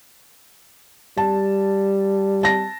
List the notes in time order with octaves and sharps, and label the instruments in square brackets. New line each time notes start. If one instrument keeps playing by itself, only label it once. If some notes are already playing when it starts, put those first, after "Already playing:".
[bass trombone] G3 [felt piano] A5
[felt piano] A5 A#6